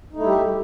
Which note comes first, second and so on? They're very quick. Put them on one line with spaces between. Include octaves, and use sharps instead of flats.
D#4 A3 E4 G3 G4